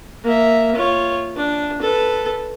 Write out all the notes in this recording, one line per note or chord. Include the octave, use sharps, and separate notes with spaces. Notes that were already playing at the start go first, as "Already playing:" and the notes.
A#3 E5
F4 C#5
D4
A4 B4